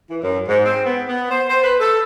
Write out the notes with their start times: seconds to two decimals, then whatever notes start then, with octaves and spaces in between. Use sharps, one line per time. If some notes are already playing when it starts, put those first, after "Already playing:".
0.10 E3
0.22 F#2
0.48 G#2
0.65 C4
0.85 B3
1.09 B3
1.30 C5
1.49 C5
1.64 B4
1.80 A4